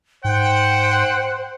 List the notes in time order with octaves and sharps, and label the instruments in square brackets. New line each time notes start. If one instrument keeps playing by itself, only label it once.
[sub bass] G#2 [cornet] C5 [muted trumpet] F#5 [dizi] G5